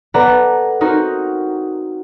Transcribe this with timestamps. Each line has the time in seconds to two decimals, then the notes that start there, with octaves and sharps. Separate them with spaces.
0.14 B3 A4 B4 D5 F#5 A#5
0.81 C4 D#4 F#4 A#4